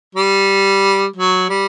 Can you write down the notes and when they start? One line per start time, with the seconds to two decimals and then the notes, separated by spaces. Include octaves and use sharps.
0.15 G3
1.16 F#3
1.49 G3